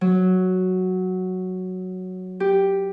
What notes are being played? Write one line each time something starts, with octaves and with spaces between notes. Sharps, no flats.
F#3
G4